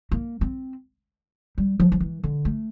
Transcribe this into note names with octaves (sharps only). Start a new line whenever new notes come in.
A#3
C4
G3
F3
F3
E3
D3
A3